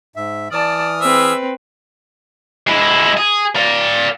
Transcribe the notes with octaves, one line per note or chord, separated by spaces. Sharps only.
G#2 E5
E3 D5 A5 D#6 F6
C4 G#4 B4 E5 E6
G#3 E4
G#4
D5 F5